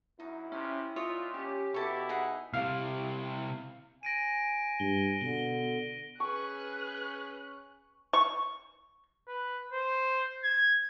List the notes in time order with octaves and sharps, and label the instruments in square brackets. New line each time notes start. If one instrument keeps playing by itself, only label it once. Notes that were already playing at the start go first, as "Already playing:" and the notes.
[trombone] F#2 [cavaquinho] D#4 [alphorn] E4
[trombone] C3 [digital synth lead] C#4
[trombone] A#2 [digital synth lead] F4 [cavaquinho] C#5 D#5 E5
[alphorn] C#4 [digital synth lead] G4
[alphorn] B2 [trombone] E4 [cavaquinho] A4 C#6
[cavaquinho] D#4 G#4 F#5
[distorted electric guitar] C3 E4 [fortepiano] F5
[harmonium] G#5 [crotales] A#6 D7 D#7
[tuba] G2 [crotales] G7
[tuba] B2 [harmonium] D3 [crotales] G7
[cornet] C#4 [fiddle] G#4 B4 [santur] C#6 [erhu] F#6
[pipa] C#6
[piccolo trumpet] B4
C5
G#6